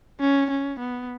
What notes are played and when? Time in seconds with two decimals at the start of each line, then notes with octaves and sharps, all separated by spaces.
0.20 C#4
0.50 C#4
0.79 B3